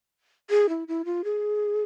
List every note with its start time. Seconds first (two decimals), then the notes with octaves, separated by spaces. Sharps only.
0.50 G#4
0.69 E4
0.88 E4
1.05 F4
1.24 G#4